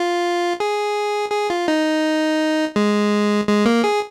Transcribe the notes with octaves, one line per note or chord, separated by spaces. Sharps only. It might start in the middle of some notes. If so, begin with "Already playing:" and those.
Already playing: F4
G#4
G#4
F4
D#4
G#3
G#3
A#3
G#4